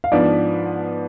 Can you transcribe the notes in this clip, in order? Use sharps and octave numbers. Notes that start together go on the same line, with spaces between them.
F5
G#2 F3 B3 D4 D5